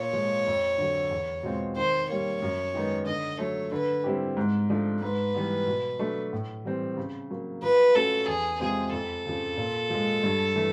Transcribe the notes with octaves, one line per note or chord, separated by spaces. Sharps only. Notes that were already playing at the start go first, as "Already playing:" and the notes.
Already playing: A#2 C#5
F3 G#3
F2
D3 F#3
E2
B2 G#3 C4 F4
D#3 C5
G3 A#3 C#5
F#2
D#3 G#3 B3 D#4
D3 D#5
F#3 A3 C#5
D3 B4
G3 C4 E4 G4
G#2
F3 A3 D4
G#2 B4
E3 G3 B3
B2
F#3 A3 D4
A2
E3 G3 C4
C#3
F#3 A#3
F3 B4
A3 C#4 F#4 A4
E2 G#4
C3 F3 G#3 C4 G#4
F2 A4
C#3 F3
A#2
F3 G#3
G2
E3 A3